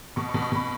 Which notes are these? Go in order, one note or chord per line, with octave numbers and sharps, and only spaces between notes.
B2 C#6
C#6
B2
C#6
B2 B5